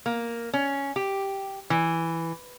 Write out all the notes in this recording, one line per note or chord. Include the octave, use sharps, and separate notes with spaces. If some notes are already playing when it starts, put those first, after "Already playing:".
A#3
C#4
G4
E3